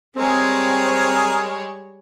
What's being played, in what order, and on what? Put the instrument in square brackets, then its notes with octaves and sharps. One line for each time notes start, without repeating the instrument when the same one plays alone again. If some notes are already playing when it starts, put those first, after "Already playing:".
[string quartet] G3 G#3 C#5 [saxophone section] C4 [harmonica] G#4 A#4